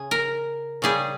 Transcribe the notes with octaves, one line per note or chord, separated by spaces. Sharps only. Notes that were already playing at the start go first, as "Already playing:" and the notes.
Already playing: C#3 G#4
A#4
C#3 G3 G#4